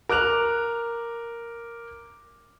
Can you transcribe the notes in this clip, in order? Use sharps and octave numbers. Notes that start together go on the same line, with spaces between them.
A#4 D6 F#6 F7